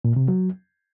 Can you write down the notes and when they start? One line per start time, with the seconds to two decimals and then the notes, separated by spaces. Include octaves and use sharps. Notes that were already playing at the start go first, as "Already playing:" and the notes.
0.05 A#2
0.16 C3
0.28 F#3